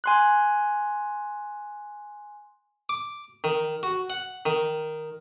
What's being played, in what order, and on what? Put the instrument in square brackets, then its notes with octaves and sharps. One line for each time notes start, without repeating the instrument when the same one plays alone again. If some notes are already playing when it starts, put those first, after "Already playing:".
[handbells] G#5 C6 F#6
[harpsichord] D6
D#3
F#4
F#5
D#3